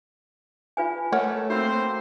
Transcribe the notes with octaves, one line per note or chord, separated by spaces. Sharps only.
F4 B4 G#5
A3 A#4 C#5 F#5
A#3 C4 F#4 C5 B5 E6